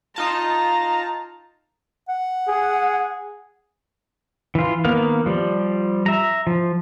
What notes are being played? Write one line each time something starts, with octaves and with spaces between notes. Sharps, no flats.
D#4 F4 A5 A#5
F#5
G#4
E3 F4
D#3 A#3 B3 F5
F3 G3
E5 A#5
F3